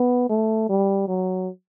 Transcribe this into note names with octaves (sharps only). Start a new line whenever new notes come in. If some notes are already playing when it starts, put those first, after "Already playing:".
Already playing: B3
A3
G3
F#3